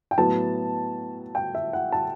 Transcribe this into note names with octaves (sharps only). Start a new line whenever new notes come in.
G5
A2 F#3 B3 A5
G5
E5
F#5
A5